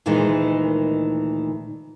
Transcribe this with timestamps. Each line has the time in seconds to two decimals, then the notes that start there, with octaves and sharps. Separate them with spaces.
0.06 D2 A#2 D#3 E3 G#3 D#4